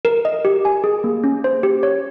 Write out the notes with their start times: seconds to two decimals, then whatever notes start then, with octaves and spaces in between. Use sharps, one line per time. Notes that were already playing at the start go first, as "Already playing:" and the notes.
0.05 A#4
0.25 D#5
0.45 G4
0.65 G#5
0.84 G#4
1.04 A#3
1.24 C#4
1.44 C5
1.63 G4
1.83 C#5